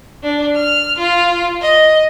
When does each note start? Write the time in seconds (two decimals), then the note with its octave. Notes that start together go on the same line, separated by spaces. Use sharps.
0.23 D4
0.55 F6
0.98 F4
1.61 D#5